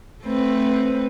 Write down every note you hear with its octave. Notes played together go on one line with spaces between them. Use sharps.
A3 C4 B4